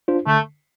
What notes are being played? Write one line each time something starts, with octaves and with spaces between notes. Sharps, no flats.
D4 F4 C5
D3 A3